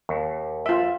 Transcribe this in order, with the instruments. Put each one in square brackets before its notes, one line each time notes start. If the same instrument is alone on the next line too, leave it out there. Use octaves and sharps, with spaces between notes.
[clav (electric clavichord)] D#2
[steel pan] F4 E5